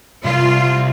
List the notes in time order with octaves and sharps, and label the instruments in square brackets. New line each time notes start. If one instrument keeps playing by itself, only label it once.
[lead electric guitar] C2 [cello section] F4